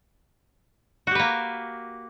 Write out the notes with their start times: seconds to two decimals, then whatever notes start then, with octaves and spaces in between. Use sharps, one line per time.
1.07 F#4
1.11 G4
1.15 B4
1.19 A#3